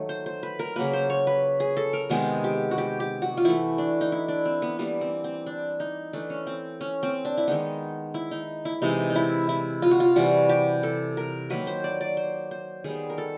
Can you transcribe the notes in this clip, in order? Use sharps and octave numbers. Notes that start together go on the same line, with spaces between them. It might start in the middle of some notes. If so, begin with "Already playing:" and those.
Already playing: D#3 F#3 A3
C5
C5
B4
A#4
C#3 F#3 A#3 B4
C5
C#5
B4
G#4
A4
A#4
C3 D#3 G#3 B3 G#4
G4
F#4
G4
G4
F#4
F4
E3 A3 E4
D4
D#4
E4
D4
C4
B3
E3 G3 A#3 B3
C4
C4
D4
D#4
E3 A3 D4
C#4
C4
C#4
C4
D4
E4
D#3 G#3 B3 D#4
E4
D#4
E4
C3 E3 G#3 D#4
D#4
E4
E4
F4
F#4
F4
C3 E3 G3 F#4
G4
A4
A#4
D#3 F#3 A#3 B4
C5
D5
D5
C5
C5
D#3 G3 B3 G#4
A#4
A4